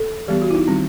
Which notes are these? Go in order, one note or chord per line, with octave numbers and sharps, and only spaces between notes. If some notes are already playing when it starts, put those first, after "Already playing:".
Already playing: A4
E3 G3 B3 G4
F#4
E4
D#4
D#3 G3 C4